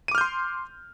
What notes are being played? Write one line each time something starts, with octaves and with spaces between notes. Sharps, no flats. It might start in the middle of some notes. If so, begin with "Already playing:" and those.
C6 D6 F6 G6 D#7